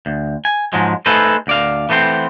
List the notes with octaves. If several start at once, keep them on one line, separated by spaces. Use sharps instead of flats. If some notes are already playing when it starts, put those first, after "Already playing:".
D2
G#5
G#2 F3 F#3 G#3
A3 D#4 G#4 A4 B4 C5
D2 D5 F5
E3 A3 B3 C4 C5